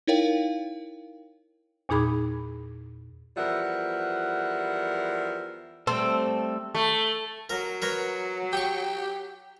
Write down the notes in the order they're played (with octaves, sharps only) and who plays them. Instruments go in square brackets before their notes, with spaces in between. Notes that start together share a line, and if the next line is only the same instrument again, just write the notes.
[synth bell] D#4 E4 A#4 C#5 F5 G5
[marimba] E2 A#2 D#4 G#4 B5 D6
[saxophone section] E2 F3 G3 A#4 E5 F#5
[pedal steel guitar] G3 A3 A4 [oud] C4
[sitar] A3
[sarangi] F#3 [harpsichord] A#4
[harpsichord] A#4 B4 C#5
[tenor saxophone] G4 [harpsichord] G5 C#6